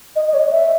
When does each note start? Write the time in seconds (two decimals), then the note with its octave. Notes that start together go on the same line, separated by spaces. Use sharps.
0.15 D#5
0.27 D#5
0.33 C#5
0.38 D#5
0.51 E5